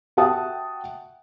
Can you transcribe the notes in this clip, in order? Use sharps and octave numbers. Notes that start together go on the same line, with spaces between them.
F#4 E5 F#5 G5 A5 D#6